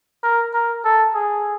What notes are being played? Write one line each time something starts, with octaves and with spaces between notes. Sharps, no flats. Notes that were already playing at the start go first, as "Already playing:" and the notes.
A#4
A#4
A4
G#4